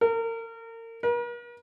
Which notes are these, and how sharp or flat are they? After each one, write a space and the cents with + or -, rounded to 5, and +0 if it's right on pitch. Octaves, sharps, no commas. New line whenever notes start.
A#4 -35
A#4 +45